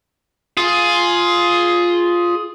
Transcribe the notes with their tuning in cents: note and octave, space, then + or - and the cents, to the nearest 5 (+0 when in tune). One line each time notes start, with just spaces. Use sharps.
F4 +0 G#4 +10